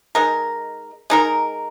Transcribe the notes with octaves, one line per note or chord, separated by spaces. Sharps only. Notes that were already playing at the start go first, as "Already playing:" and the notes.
G#3 D#4 A#4
G#3 D#4 A#4